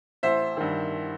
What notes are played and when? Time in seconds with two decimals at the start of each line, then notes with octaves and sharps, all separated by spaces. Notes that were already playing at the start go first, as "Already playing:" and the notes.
0.23 A1 C5 E5
0.57 G2 D#3